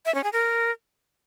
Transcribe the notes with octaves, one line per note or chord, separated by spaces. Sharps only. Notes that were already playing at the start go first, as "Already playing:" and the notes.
E5
C#4
G#4
A#4